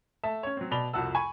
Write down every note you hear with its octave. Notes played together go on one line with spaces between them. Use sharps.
A3 E5 A5
C#4 C#5
F#3 C4
B2 D5 B5 F7 G7
C2 F2 F#4 F#5 A5 E6
G#5 B5 C#6